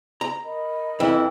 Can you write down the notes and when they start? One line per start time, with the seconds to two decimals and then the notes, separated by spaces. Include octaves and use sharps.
0.21 A#5
0.44 A#4 D#5 B5
1.00 F2 E3